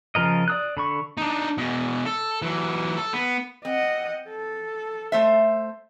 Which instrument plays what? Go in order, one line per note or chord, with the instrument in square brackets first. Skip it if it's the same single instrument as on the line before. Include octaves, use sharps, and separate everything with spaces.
[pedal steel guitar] C#3 F3 A#4 D#5
D5 D#6 F#6
D3 B5 C#6
[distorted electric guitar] D4 D#4
B2 G#3
A4
E3 F#3
A4
B3
[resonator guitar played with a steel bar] C4 [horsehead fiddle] D#5 F#5
[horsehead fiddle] A4
[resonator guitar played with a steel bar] A3 C5 E5